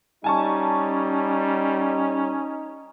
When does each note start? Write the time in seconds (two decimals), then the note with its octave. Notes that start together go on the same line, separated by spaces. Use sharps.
0.24 G3 C#4 D#4 G#5 A5 C#6